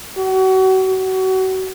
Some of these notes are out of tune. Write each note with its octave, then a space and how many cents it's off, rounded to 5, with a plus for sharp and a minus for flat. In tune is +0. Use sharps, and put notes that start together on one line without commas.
F#4 +35
F#4 +30